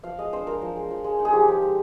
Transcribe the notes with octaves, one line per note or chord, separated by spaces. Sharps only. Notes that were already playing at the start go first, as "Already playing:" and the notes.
F3 F5
G#3 D#5
D4 C5
F4 A#4
F3
G#3
F3
G#3
D#4
G#4
F3 G4
F3
G#3